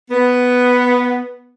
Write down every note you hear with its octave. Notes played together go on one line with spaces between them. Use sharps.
B3